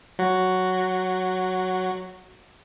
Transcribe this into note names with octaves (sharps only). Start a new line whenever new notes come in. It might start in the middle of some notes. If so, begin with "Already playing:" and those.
F#3 F#4